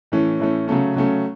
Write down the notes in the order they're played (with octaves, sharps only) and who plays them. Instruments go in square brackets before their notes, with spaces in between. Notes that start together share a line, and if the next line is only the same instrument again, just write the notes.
[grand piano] A2 E3 A3 C#4
A2 E3 A3 C#4
C#3 F#3 A3 C#4
C#3 F#3 A3 C#4